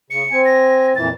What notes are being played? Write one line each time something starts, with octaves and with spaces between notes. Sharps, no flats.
C#3 C#7
C4 G#5
A#6
F2 A#2 E3 A6